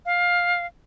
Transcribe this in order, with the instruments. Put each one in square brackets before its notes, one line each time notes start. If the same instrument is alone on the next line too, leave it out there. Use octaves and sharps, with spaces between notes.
[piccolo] F5